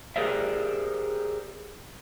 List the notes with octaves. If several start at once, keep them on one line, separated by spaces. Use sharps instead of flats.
G4 G#4 A#4 C5 D5 E5